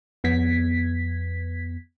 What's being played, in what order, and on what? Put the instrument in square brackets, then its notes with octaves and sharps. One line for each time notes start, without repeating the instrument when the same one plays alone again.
[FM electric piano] F2 B3 G#6 B6